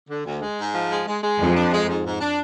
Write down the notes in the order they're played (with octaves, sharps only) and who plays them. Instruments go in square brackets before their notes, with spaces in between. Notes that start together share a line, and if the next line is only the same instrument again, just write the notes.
[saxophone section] D3
D2
G#3
G#2
F3
G#3
G#3
G#3
[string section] F2 F3 [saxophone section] G#2
[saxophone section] D4
G#3
G#2
G#2
D4